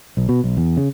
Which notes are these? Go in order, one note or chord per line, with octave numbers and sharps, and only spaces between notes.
B1
B2
B1
E2
C#3